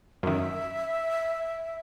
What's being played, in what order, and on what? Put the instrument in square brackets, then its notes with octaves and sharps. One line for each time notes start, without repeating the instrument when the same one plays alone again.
[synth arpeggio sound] F#2 D#3 [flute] E5